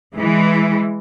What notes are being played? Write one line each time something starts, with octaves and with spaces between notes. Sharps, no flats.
E3 G#3